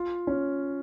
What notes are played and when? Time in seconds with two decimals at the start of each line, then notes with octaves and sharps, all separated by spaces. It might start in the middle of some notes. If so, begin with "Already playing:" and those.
Already playing: F4
0.27 C#4